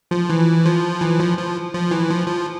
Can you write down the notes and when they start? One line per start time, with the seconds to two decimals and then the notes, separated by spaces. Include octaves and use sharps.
0.11 F3
0.30 E3
0.66 F3
1.01 E3
1.20 F3
1.38 F3
1.74 F3
1.91 E3
2.10 F3
2.27 F3